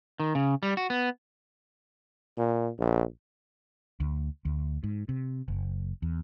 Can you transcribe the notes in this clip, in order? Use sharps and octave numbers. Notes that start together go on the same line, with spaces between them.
D#3
C#3
G3
F#4
B3
A#2
A#1
D2
D2
G#2
C3
F#1
E2